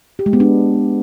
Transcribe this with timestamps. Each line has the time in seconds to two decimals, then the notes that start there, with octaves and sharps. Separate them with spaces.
0.19 G4
0.26 G#3
0.33 B3
0.40 D4